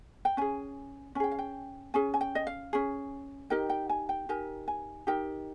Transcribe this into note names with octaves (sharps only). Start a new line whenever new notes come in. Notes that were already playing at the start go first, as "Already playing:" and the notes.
G5
C#4 G#4 G#5
C#4 G#4 G5 G#5
F5
G5
C#4 G#4 G#5
G#5
G5
D#5
F5
C#4 G#4
D#4 G4 A#4 G5
G5
G#5
G5
D#4 G4 A#4 G#5
G#5
D#4 G4 A#4 G5